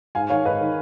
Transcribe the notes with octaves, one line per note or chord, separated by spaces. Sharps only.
G#2 F5 G#5
D#3 C#5 F5
G#2 B4 D#5
D#3